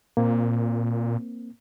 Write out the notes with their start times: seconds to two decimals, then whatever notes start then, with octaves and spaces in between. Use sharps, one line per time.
0.17 A#2 A#3 C4